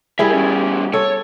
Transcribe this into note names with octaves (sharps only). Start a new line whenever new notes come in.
G3 E4 G#4 A#4 E5
E2 C#4
A4 C#5